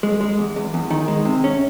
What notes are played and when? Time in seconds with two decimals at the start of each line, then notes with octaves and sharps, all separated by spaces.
0.03 G#3
0.21 G#3
0.39 E2
0.56 E2
0.74 E2
0.90 D#3
1.08 G#3
1.25 C3
1.44 C#4